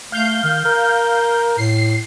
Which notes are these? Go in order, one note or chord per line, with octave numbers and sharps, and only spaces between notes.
A3 F5 G6
D#3
A#4
A2 C7